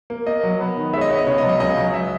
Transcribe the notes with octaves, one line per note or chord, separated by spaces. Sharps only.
A#3
A#3 D#5
F#3
B3
D#3
G#3 C#5 E5
D#5
B3 C#5
D#5
C#3 C#5
D#5
F#3
D#5
C#2 D#5
F#3
E5